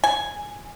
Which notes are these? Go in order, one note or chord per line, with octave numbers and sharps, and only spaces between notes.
G#5